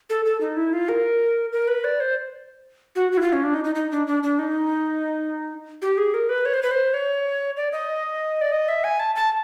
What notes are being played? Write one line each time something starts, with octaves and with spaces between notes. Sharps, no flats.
A4
A4
D#4
E4
F4
A#4
A#4
B4
D5
C5
F#4
F#4
E4
F4
C#4
D4
D#4
D#4
D#4
D4
D4
D4
D#4
G4
G#4
A#4
B4
C#5
C5
B4
C5
C#5
D5
D#5
D5
D#5
E5
G#5
A5
A5